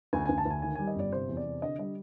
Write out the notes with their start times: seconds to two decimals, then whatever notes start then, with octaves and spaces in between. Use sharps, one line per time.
0.13 D2 G#5
0.26 D2 G#5
0.38 A5
0.45 D2 G#5
0.62 D#3 G#5
0.75 G3 G#5
0.87 D#5
0.96 G1 D5
1.12 C3 C5
1.29 E2
1.37 D5
1.46 C3
1.62 D3 D#5
1.78 G3 D#5